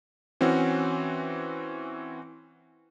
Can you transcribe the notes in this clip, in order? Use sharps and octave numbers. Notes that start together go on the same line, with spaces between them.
E3 C4 C#4 F#4